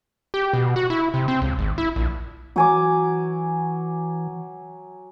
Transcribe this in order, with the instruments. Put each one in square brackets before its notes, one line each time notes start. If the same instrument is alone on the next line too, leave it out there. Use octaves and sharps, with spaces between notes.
[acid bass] G4
B2
F#4
E4
C3
C4
C#2
G#1
E4
A#1
[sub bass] E3 [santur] F#3 G#5 D6